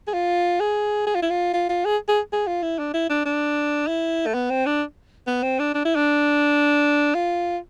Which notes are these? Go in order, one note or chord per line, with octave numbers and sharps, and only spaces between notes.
G#4
F4
G#4
G#4
F4
E4
F4
F4
F4
G#4
G#4
G#4
F4
E4
D4
E4
D4
D4
E4
A3
B3
C4
D4
B3
C4
D4
D4
E4
D4
F4